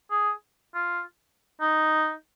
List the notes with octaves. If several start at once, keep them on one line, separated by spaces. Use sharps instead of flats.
G#4
F4
D#4